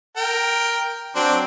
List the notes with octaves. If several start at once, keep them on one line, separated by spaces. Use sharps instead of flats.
A#4 G5
F#3 C4 D4